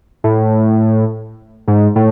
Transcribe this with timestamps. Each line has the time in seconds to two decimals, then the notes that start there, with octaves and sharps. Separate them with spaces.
0.24 A2
1.68 G#2
1.96 A2